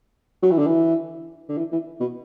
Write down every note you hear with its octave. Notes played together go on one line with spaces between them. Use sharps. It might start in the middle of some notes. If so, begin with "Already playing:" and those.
F#3
E3
D3
E3
D3
E3
E3
B2